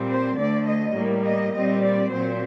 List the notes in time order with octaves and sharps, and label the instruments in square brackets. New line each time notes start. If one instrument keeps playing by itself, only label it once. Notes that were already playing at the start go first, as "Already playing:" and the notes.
Already playing: [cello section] A#2 G3 C4
C5
D2 D3 A3 D5
D#5
A2 G3 A#3
D#5
A#2 G3 C4 D#5
D5
A#2 F#3 C4 C5